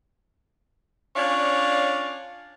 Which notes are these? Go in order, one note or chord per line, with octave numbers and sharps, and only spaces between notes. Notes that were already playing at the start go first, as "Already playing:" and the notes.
C#4 D4 F4 C#5 D5 F5